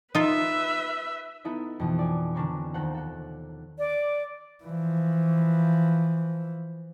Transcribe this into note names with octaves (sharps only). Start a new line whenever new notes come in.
D#4 F4 B4 E5
B3 D#4 E4 A4 D#5
F2 B2 E3
D5 G#5
D3 C#4 D4 A#4 C#5
D#2 D#3 A4 C5 F#5
A4 F#5
D5
E3 F3